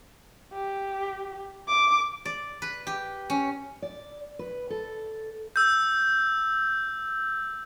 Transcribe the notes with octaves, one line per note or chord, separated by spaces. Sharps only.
G4
D6
D5
B4
G4
C#4
D5
B4
A4
E6 G6